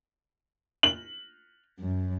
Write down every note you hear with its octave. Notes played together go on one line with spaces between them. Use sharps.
F#7
F#2